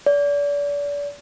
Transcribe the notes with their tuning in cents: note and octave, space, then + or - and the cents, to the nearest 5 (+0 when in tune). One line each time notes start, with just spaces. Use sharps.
D5 -35